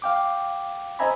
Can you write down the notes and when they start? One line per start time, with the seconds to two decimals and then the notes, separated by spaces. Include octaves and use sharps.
0.02 F5 G5 D6
0.99 C5 D#5 E5 G#5 A#5 B5